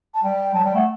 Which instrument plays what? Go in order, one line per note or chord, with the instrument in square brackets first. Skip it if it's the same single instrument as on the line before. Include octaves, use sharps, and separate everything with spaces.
[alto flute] A5
[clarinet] G3 [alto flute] G5
[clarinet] F#3 [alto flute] A5
[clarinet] G3 [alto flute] G5
[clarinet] A3 [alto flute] F#5